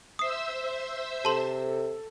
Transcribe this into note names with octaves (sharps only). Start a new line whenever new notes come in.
C5 E5 D#6 E6 C7
C3 A4 A5 C6